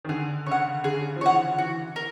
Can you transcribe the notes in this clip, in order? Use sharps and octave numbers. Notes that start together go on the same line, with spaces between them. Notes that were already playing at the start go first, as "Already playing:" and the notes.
D#3
D3 G#4
C#3 C#5
F#5
D3 G#4
F3
E3 C#5 F#5
E3 F#4
A#4